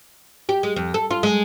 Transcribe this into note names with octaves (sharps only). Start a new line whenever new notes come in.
G4
G#3
F2
A4
F4
G#3